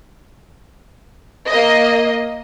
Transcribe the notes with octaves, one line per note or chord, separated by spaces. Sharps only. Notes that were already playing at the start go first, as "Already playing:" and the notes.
A#3 D#5